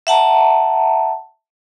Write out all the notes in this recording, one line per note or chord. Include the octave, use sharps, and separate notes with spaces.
E5 F#5 A5 A#5